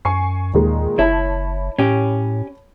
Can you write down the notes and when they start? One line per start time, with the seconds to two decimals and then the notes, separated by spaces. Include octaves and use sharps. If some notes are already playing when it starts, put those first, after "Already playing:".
0.05 F#2 G#5 C#6 C7
0.53 D#2 A#2 D#3 G#3
0.99 F#1 E4 C#5 A5 B5
1.79 A2 C#4 G4